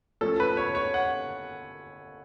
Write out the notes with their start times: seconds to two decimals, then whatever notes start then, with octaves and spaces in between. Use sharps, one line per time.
0.21 F3 A3 C#4 A4
0.40 B4
0.57 C#5
0.75 C#5
0.94 F#5